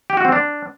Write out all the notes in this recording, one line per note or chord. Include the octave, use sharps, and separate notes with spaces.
G4
F#4
C4
D4